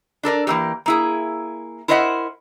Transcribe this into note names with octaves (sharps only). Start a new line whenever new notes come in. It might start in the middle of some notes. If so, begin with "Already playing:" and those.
D4 A4 A#4 D5
E3 A#3 G4
A#3 E4 G#4
E4 A#4 C5 D#5 E5 F#5